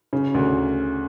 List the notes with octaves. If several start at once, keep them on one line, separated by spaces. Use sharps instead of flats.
C#3
D2